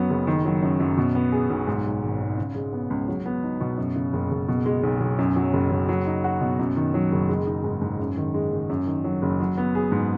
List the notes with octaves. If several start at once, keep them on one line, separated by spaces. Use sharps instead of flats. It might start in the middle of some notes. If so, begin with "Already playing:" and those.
Already playing: F#2 F#3 B3
F#1
D#3
F#3
F#2
F#2
B2
B3
G#4
B1
G#2
G#3
G#1
G#1
C#3
G#3
B3
C#2
F#3
B3
D#4
B2
F#2
C#3
F#1
F#1
B2
G#3
B1
B1
F#2
F#3
F#1
F#1
F#3
D#4
F#4
B2
F#2
D#3
F#3
F#1
G#3
D#4
G#2
G#2
F#2
D#3
G#3
F#1
F#2
D#3
F#3
F#1
F#3
B3
G#4
G#2